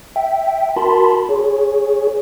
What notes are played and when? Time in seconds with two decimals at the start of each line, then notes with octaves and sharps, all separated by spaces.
0.16 E5 G5
0.76 F#4 A#4 A5 B5 C6
1.29 G#4 C#5